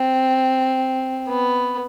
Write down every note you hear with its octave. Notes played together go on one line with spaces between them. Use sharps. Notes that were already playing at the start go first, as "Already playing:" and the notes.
Already playing: C4
B3